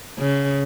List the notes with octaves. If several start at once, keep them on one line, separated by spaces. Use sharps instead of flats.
C#3